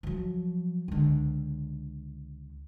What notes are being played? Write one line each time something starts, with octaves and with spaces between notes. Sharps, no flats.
F3 F#3
C#2 D3